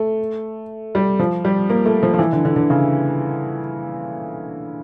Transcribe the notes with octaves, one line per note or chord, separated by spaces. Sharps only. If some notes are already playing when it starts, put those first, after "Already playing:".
Already playing: A3
G3
F3
G3
A#3
A3
F3
F3
E3
D3
D3
D3
C#3